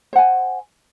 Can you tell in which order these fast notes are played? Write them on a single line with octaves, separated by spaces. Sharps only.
C5 F#5 G#5